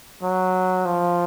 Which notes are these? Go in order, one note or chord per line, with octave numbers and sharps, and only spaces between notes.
F#3
F3